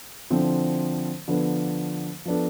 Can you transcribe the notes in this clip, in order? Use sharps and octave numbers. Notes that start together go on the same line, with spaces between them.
D3 F3 C4 E4
D3 F3 B3
F3 B3 D4 A4